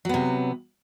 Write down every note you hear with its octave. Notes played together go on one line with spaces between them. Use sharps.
C3 F#3 B3